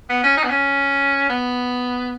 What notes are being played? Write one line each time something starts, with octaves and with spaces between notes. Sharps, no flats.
B3
C#4
D#4
B3
C#4
B3